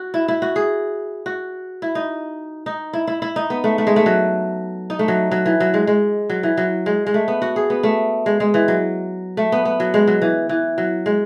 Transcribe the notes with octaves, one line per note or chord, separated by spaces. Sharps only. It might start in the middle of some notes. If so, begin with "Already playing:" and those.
Already playing: F#4
E4
E4
F#4
G#4
F#4
E4
D#4
D#4
E4
E4
E4
D#4
B3
A3
A3
G#3
A3
F#3
D#4
A3
F#3
F#3
E3
F#3
G#3
G#3
F#3
E3
F#3
G#3
G#3
A3
B3
F#4
G#4
B3
A3
G#3
G#3
E3
F#3
A3
B3
B3
F#3
G#3
F#3
E3
E3
F#3
G#3